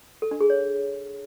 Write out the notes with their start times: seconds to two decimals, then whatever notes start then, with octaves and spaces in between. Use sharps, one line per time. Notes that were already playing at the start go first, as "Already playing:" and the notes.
0.22 A4
0.31 D4
0.41 G#4
0.50 C#5